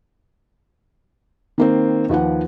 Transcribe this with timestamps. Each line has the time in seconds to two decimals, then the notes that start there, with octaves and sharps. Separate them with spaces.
1.58 D#3 A#3 C4
2.09 D#2 F3 B4 F#5